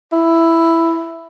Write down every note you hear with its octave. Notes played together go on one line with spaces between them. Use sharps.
E4